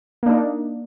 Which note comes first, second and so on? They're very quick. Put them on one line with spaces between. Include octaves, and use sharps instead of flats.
A#3 D4 D#4